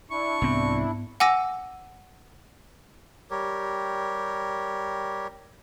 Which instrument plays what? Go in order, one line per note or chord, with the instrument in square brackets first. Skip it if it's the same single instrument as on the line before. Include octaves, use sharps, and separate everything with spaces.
[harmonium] D4 E4 [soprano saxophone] C#6
[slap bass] C2 C4 [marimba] G#2 B3
[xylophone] F#5 G#5 D6 E6 A#6
[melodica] G3 G4 A#4 C#5